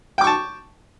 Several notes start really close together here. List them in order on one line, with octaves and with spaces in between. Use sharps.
G5 D6 C#6 A5